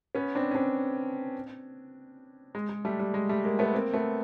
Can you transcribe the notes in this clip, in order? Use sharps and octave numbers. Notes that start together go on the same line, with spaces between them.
B3 C#4
C4 D4
C#4
C4 D4
G#3
G#3
G3 A3
G3
G#3
G3 A3
G#3 A#3
A3 B3
A#3 C4
A3 B3